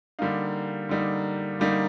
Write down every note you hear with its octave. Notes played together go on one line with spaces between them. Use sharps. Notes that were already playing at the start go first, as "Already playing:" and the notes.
D3 G3 A#3 D#4 F5
D3 G3 A#3 D#4
D3 G3 A#3 D#4